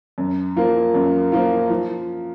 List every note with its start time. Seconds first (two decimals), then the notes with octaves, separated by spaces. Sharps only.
0.18 F#2
0.56 F3 A#3 F4
0.95 F#2
1.32 F3 A#3 F4
1.70 F3